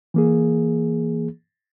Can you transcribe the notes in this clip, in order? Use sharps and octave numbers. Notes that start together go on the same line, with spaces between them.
E3 A#3 G#4